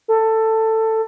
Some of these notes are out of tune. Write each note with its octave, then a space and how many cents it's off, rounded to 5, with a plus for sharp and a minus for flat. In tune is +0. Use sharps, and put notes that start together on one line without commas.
A4 +15